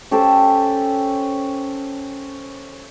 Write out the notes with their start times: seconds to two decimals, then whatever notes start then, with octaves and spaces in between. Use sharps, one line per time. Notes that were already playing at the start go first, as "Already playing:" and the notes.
0.11 C#4 G4 A4 C5